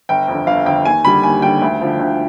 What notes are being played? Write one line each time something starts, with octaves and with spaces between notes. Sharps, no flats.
G1 G5
F2 D3
G1 F5
F2 D3 G5
D#2 G#5
D3 G3 B5
D#2 G#5
D3 G3 G5
D2
D3 F3
D2